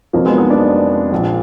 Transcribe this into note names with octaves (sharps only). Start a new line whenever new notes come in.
F1 F2 F3 F#3 A#3
G#3 B3
B3 D#4
A#3 D4
A#1 A#2 F3